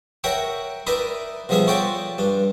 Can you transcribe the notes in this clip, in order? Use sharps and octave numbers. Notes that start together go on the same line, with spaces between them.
F#4 A#4 C#5 E5 F#5 G5
D#4 E4 A#4 B4 D5 E5
B2 F3 G3 G#4 E5 F5
F4 F#4 A4 C#5 D5 G5
G2 D4